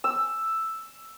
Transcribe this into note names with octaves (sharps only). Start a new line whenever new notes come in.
E6